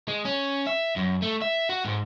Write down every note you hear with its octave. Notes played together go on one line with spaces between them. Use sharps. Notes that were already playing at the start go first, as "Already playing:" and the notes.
G#3
C#4
E5
F#2
A3
E5
F#4
G#2